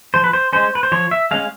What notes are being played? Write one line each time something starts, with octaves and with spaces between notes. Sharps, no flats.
F3 C5
B4
C5
G#3 C#4 C5
B4
C5
F3 C#5
E5
G#3 C#4 F5